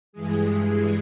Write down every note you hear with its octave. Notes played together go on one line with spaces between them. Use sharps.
G2 E3 G#3 G#4